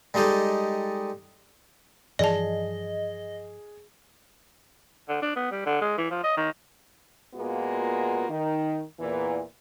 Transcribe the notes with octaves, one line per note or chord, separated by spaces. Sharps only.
G3 G#3 D#4 G4 A4
G2 E3 F3 G#4 D5 D#5 A5
D3
D4
B3
G3
D3
G#3
E3
F3
D#5
D#3
A#2 G#3 A#3 B3 F4 F#4
D#3
E2 A#2 E3